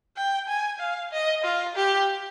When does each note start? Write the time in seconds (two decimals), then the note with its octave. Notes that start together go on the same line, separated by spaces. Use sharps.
0.17 G5
0.48 G#5
0.80 F5
1.12 D#5
1.44 F4
1.76 G4